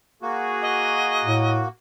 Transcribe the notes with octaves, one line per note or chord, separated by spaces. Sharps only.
A#3 F#4 G#4
D#5
A2